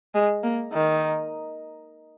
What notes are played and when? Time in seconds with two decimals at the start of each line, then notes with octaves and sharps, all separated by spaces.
0.15 G#3
0.43 A#3
0.72 D#3